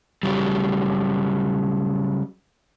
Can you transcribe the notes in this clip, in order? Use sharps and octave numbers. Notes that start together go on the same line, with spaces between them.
C#3 F#3 G3